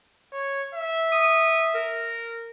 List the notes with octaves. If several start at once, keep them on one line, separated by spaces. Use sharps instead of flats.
C#5
E5
D#6
A#4